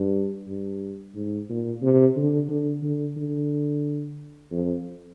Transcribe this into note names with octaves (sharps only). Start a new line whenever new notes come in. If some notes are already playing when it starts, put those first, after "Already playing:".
Already playing: G2
G2
G#2
A#2
C3
D3
D3
D3
D3
F2